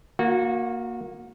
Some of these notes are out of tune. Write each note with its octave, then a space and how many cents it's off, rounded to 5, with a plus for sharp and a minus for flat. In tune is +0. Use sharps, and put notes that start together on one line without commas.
A#3 +5 F#4 -25